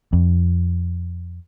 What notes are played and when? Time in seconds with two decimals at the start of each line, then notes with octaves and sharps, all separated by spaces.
0.13 F2